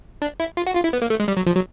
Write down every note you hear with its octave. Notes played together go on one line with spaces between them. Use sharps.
D4
E4
F4
F#4
F4
E4
B3
A#3
A3
G#3
G3
F#3
F3
F#3